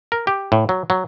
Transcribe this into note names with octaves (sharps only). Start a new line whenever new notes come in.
A#4
G4
A2
F#3
F#3